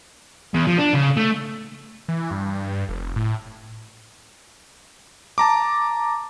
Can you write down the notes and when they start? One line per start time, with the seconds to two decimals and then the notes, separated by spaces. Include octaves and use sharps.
0.54 E2
0.67 F3
0.78 D4
0.93 C#3
1.17 A3
2.09 E3
2.31 G2
2.89 F1
3.16 A2
5.38 A5 A#5 D6